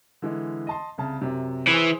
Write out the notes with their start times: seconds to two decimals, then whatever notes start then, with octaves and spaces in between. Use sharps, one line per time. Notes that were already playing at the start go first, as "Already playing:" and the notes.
0.22 D3 E3 G#3
0.67 D#5 A5 C6
0.98 C2 C#3 A5
1.22 F#2 C3
1.68 E3 G#4 C5